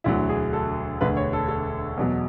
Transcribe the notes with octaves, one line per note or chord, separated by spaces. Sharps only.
E1 D2 D3 F#3 E4
G#4
A4
E1 D2 D3 B4
C#5
A4
A4
E2 B2 F#3